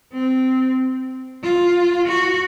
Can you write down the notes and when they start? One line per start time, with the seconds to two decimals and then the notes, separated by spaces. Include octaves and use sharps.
0.13 C4
1.43 F4
2.08 F#4